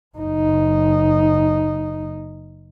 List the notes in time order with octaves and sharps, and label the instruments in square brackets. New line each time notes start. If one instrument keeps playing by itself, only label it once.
[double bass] F#1 D#4